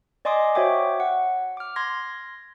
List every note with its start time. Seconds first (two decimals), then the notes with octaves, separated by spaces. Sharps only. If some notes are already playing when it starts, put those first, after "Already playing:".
0.25 D5 D#5 G#5 C6 D6 D#6
0.55 F#4 C5 C#5 E5 G5 D6
1.00 F#5
1.57 D6 F6
1.76 C6 G#6 A#6